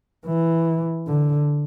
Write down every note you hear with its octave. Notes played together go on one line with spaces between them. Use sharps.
E3
D3